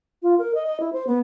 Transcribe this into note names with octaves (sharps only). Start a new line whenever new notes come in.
F4
A#4
D#5
D#5
E4
C5
B3